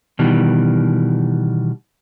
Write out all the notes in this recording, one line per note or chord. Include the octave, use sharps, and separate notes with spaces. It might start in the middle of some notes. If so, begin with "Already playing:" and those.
B2 D#3 E3 G3